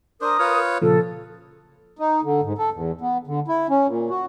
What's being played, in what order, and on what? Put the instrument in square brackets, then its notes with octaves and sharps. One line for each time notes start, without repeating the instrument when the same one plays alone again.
[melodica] D4 C5 [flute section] A#4 D#6
[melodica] F4 B4 C#5 [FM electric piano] F6
[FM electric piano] A#2 C#3 F3 [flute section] A4
[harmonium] D#4
D3
G#2
A4
E2
B3
D3
E4
C#4
A#2
F#4